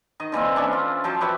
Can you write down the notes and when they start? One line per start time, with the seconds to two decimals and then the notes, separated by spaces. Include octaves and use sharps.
0.20 D#3 D#5
0.32 D3 E3 A#3 C4
0.56 C#4 D4 A4 E5
0.73 F4
1.04 F3 F#3 C5 A5
1.20 G4 B4 C#5 E5